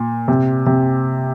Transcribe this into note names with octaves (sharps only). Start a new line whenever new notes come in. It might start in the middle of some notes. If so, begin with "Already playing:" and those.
Already playing: A#2
C3
C3